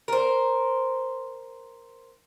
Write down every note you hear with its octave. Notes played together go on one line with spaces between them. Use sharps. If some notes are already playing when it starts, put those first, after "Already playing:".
A#4 C5